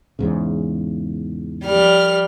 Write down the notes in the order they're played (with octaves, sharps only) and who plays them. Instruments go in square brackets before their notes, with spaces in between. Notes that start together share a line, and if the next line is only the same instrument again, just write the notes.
[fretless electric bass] E2 G#2 C#3
[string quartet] F3 G3 F6